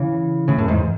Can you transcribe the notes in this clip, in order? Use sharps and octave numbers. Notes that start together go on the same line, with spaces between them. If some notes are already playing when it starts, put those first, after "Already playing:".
Already playing: C#3 E3
A2 C#3
F#2 A2
E2 G#2